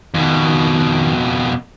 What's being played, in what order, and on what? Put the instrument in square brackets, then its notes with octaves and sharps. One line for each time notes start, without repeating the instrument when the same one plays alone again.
[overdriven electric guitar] F2 B2 [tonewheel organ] D#3